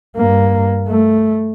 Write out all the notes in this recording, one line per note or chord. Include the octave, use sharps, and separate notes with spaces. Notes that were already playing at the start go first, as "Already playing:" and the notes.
G2 A#3
A3